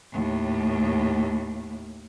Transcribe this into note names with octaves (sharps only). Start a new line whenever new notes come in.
D#2 A2